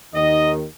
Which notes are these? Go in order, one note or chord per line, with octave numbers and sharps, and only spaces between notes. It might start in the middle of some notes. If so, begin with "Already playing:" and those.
D#2 D#3 D#5